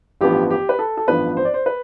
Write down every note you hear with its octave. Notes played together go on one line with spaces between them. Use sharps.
A1 G2 F3 B3 G4
G4
B4
A4
A4
A1 G2 F3 B3 B4
C5
D5
C5
B4